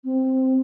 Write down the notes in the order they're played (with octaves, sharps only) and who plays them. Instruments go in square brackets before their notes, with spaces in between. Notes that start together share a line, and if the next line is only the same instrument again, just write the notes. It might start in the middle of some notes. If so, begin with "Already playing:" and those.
[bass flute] C4